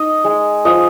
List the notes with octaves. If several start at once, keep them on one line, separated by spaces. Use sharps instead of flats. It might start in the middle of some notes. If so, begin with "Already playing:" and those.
Already playing: D#4 D#5
G#3
F3 D#5